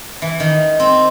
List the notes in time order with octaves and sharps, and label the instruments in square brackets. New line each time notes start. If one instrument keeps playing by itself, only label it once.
[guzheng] E3
D#3
C4